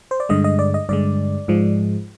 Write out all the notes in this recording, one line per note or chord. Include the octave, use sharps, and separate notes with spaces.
C5
D5
G2 D3 G#3 D#5
D#5
D5
D#5
G2 D3 G#3 D5
G#2 F3 G#3